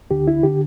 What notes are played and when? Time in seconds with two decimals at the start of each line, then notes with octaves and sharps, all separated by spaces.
0.10 D2 D3 G4
0.27 E4
0.43 D3 G4